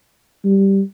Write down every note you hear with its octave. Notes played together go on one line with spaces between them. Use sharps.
G3